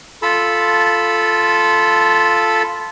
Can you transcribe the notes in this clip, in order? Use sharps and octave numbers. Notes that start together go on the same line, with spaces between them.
F4 A4 A5 B5